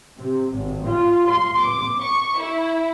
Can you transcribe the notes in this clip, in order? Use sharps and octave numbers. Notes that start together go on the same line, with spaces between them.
C3
G#1
F4
C6
D6
C#6
E4